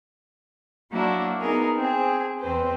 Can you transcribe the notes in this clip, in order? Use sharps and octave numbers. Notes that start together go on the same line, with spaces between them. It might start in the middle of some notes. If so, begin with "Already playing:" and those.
F#3 A#3 D4 E4 F#4
B3 D#4 G#4 A#4
C4 G#4
E2 C4 B4 C5